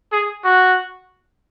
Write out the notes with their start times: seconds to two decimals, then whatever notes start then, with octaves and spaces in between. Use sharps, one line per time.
0.12 G#4
0.44 F#4